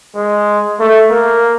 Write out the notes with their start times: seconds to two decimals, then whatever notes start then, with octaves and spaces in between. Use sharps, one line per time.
0.16 G#3
0.79 A3
1.10 A#3